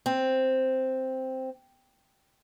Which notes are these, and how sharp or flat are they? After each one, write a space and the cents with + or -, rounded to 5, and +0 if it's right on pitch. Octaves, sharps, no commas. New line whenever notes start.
C4 +0